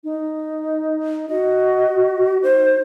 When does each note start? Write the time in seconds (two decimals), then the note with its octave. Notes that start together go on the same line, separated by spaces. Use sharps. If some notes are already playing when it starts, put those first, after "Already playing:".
0.04 D#4
1.30 F#4 D#5
2.43 D#4 C5